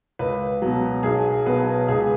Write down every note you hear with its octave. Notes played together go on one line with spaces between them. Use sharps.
C#2 B4
B2 F#3
B1 G#4
B2 F#3 B4
C#2 G#4